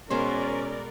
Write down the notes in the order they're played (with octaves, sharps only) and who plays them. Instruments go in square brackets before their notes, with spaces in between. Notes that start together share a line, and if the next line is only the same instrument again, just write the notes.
[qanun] B2 G#3 B3 [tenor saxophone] C#4 [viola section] A#4 D5 [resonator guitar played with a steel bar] C5